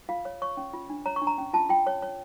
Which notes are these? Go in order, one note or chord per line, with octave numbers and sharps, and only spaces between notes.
F4 F5
C#5
C#5 C#6
C#4
F4
D4
C#5 A#5
C#6
D4
A#5
C#4
F4 A5
F4 G5
C#5
C#5